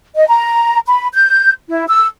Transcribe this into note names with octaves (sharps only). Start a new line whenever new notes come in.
D#5
A#5
B5
G6
E4
E6